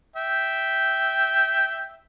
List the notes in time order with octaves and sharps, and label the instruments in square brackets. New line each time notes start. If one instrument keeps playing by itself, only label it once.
[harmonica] E5 G5